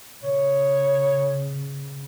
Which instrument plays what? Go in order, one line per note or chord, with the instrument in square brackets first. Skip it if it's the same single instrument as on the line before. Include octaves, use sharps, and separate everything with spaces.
[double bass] C#3 [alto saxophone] C#5